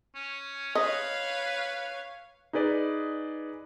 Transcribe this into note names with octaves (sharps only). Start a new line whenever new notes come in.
C#4
B4 C#5 D#5 F5
D#4 G#4 B4 D5